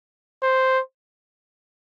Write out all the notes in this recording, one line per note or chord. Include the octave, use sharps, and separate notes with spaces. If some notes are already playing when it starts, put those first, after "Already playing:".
C5